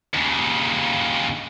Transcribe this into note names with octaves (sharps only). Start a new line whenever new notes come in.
D#2 C#3